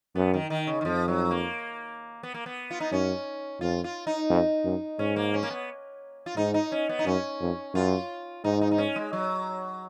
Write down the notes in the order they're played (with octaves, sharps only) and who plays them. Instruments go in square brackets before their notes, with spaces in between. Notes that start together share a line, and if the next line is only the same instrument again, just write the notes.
[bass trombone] F#2 [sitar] B3
[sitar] D#3
D#3
C#3
D#3
[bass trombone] F2 [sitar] F3
[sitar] F#3
A#3
B3
A#3
B3
F4
D#4
[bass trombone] F#2 [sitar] C#4
[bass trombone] F2 [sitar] F4
[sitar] F4
D#4
[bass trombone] F2
F#2
[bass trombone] G#2 [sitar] C#4
[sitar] A#3
C#4
A#3
B3
F4
[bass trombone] G#2 [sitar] D#4
[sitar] D#4
C#4
B3
D#4
[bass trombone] F#2 [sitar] C#4
[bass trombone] F2
[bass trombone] F#2 [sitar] F4
[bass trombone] G#2 [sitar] D#4
[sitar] D#4
D#4
C#4
G#3
F#3